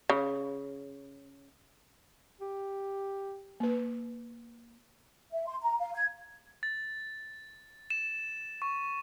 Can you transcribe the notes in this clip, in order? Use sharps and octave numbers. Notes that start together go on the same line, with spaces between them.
C#3
G4
A#3 B4
E5
C6
A#5
F5
G#6
A6
E7
C#6